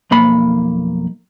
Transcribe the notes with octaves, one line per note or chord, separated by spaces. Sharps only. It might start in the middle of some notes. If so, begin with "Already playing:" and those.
B1 F2 A#3 B5